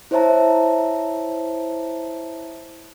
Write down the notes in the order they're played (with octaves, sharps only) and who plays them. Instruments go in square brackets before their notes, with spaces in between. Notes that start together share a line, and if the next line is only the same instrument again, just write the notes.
[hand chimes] E4 C5 C#5 E5 A5 A#5